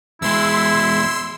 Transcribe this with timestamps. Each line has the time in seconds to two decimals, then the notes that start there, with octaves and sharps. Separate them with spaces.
0.22 E2 G#3 E4 C6 E6